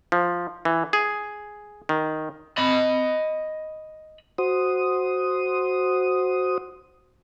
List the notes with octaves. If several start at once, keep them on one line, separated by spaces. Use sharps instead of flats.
F3
E3
G#4
D#3
D#5 B5
F#4 C5 D#6